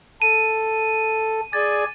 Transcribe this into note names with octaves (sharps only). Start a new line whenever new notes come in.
A4 D#7
G#4 D5 G#5 A6